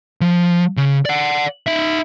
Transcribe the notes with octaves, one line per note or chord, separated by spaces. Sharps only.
F3
C#3
D5 F#5
D#4 E5